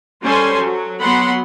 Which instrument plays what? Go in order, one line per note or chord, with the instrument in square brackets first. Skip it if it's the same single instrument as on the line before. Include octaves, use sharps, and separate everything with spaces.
[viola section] G3 C#4 A4 C5 G#5 C6
F#3
F#3 B3 F#5 B5 C6